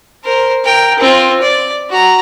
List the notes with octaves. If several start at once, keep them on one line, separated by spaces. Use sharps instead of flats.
A#4 C5
A#4 G5
C4 F4
D5
F#4 A#5